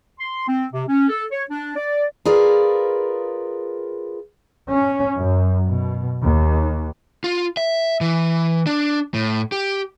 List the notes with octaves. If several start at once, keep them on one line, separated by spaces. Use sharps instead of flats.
C6
C4
C3
C#4
A4
C#5
D4
D5
F4 G#4 A#4 B4 D5 F5
C#4
F#2
B2
D#2
F4
E5
E3
D4
A2
G4